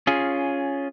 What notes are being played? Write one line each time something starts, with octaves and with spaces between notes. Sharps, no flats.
C#4 F4 G#4